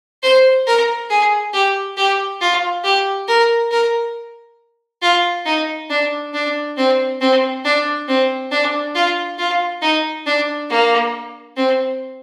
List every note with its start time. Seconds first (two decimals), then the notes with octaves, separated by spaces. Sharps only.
0.23 C5
0.67 A#4
1.10 G#4
1.54 G4
1.97 G4
2.41 F4
2.84 G4
3.28 A#4
3.71 A#4
5.02 F4
5.46 D#4
5.90 D4
6.34 D4
6.77 C4
7.21 C4
7.64 D4
8.08 C4
8.51 D4
8.95 F4
9.38 F4
9.82 D#4
10.26 D4
10.70 A#3
11.57 C4